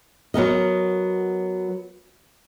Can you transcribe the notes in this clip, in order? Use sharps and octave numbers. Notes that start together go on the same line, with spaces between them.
F#3 B3 A#4 D#5